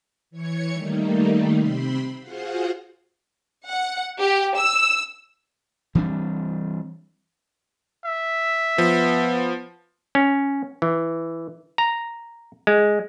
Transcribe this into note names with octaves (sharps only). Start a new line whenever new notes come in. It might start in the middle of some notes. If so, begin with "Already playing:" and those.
E3 C#5 G#6 C#7
D#3 G3 A3 A#3 D#4
C3 C4 B5 C6
F4 F#4 G#4 C5 F5 F#5
F#5
G4
E6
E3 G3 C4 D4
E5
F3 B3
C#4
E3
A#5
G#3